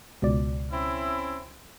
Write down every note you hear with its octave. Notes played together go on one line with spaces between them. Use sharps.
C#2 B2 D5
C4 C#4 E4